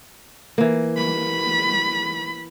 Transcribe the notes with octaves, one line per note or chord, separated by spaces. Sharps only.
E3 A#3
B5